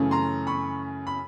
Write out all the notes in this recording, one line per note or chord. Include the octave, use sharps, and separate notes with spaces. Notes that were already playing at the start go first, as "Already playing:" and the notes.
Already playing: F#2 C#3 E3 A3 C#4
A#5 C6
B5 C#6
B5